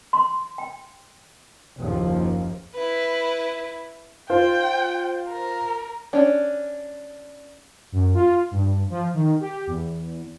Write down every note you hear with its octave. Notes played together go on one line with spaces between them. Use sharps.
C6
G5
F#1 D#2 F3 A#3
E4 B4
F4 C5 G5
A#4
C#4 D4
F#2
F4
G2
F3
D#3
G4
E2